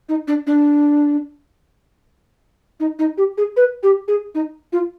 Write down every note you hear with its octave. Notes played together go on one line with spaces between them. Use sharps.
D#4
D4
D4
D#4
D#4
G4
G#4
B4
G4
G#4
D#4
F4